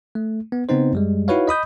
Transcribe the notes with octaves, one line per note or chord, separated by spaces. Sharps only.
A3
B3
C#3 B3 C4 D#4 C5
F#2 G3 G#3
D#4 E4 F#4 B4 C#5 F5
D#5 B5 D#6 G6